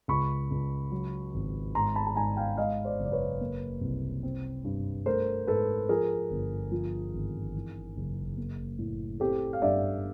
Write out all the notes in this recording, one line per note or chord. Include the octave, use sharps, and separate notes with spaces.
C#2 B5 C#6
C#2
F#3
G#1
G#2 A#5 C6
A5 B5
A5
G#2 G#5 A#5
F5 G5
G#3 D#5 F5
C5 D5
F#1
D5
B4 C#5
A#3
C2
C4
G2
A3 A#4 C5
G#2 A4 B4
F3 G#4 A#4
G1
F3
G#1
E3
F#1
A#3
A2
C4 G4 A4
F5
G2 D5 E5